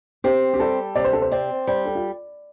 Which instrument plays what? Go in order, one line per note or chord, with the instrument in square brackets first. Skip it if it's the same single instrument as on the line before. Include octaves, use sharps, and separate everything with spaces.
[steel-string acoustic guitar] C4 [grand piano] G4
[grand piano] G4
[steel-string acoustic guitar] G3 [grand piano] A4
[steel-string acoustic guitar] C3 [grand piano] D5
[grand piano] C5
A4
C5
[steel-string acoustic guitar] C4 [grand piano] D5
[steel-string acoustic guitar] G3 [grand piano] C5
[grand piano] A4
F4